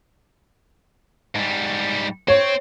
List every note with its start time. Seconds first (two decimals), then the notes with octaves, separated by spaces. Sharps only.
1.35 G#2 G3
2.28 C4 C#5